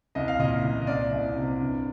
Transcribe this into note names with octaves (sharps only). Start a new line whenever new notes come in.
C2 D#5
F5
A#2 D#5
A#2
D#5
C2 D5
C2
C3
G2